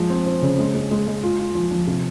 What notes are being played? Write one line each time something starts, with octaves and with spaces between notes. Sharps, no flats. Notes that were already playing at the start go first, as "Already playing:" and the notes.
Already playing: F3 G#3
C4
C4
C#3
G#3
G#3
G#3
G#3
F4
F4
F3
F3
C3